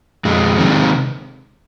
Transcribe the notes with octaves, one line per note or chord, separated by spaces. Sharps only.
F2 G#3
C3 D#3